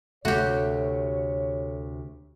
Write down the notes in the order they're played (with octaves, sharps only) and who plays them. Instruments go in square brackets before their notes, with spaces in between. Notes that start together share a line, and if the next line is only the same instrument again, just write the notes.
[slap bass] D2 C3 [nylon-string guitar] A3 [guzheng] F#4 G4 [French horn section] C#5